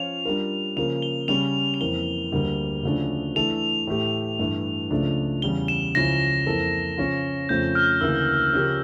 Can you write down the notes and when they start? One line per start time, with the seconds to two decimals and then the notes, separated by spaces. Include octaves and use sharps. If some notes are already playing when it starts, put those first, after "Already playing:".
Already playing: F3 C#4 F4 C#5 F5 F7
0.25 G3 D4 F4 A#4
0.77 C#3 F3 A#3 F7
1.02 G7
1.28 C#3 G3 C#4 F7
1.74 F7
1.80 F2 E3 A#3 G7
2.32 D2 D3 G3 A#3
2.84 D2 C#3 F3 A3 D4
3.35 E3 A3 D4 A4 F7
3.87 A2 E3 A3 E4 G4
4.39 G2 E3 A3 E4
4.90 C#2 C#3 F3 A3 D4
5.42 E2 C#3 G3 G7
5.68 E7
5.95 C#2 C#3 F3 C#4 E4 A#6
6.46 F2 E3 A#3 E4 A4
6.98 C#3 F3 C#4 F4
7.49 F2 C#3 F3 A3 C#4 G6
7.75 F6
8.01 D2 C#3 E3 A#3 E4 E6
8.53 C#3 F3 C#4 G4 A#4